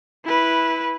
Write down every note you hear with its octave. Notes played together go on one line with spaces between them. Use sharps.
E4 B4